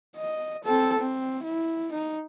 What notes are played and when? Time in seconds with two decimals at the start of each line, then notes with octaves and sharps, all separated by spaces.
0.17 D#5
0.64 C4 A4
0.98 C4
1.43 E4
1.92 D#4